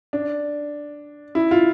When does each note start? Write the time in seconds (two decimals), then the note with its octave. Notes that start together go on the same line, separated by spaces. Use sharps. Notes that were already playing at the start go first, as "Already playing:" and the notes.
0.13 D4
1.35 E4
1.51 F4